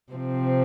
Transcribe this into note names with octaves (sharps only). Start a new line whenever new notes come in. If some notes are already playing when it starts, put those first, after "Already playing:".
C3 F3 C4